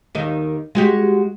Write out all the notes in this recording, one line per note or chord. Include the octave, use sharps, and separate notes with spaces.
D#2 D#3 D#5
G#3 F#4 G4